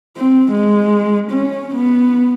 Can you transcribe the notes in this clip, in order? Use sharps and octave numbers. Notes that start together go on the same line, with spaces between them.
C4
G#3
C#4
B3